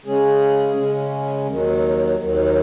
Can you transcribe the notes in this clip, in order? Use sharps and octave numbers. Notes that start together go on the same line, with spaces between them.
C#3 G#3 C#4 G#4
C#3 G#3 C#4
D#2 D#3 F#3
D#2 D#3 F#3